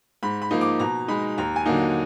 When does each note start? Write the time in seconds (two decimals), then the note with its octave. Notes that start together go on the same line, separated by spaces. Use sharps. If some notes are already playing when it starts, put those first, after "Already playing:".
0.23 G#2 B5
0.42 B5
0.51 F3 A#3 D#4
0.61 D6
0.80 B2 A#5
1.08 G#3 D#4 B5
1.38 D#2 A#5
1.56 G#5
1.66 D3 F#3 A#3 D#4